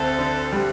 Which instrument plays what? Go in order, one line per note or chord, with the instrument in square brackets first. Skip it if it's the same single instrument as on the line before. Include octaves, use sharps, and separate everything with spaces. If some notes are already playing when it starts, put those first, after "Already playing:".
Already playing: [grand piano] D2 C4 [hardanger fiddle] A4
[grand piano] D3
G3